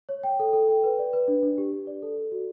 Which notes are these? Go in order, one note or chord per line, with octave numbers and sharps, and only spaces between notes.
C#5
G5
A4
A4
G5
B4
D5
B4
D4
D4
G4
G4
D5
A4
A4
F#4